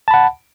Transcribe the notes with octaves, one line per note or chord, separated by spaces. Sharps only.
F#5 A5 B5